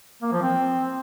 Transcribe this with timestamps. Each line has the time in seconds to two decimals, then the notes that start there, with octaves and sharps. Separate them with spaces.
0.22 A#3
0.32 F3
0.42 C4